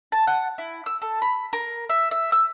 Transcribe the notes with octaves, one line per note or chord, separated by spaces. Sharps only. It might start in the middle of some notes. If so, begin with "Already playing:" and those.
A5
F#5
E4
E6
A4
B5
A#4
E5
E5
E6